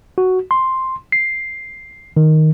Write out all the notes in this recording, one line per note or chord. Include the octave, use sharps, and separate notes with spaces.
F#4
C6
C7
D#3